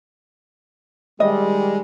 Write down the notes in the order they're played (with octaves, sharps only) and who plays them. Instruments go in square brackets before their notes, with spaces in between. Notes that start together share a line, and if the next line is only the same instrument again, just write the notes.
[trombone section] D#3 G3 [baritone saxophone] G#3 [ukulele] D#5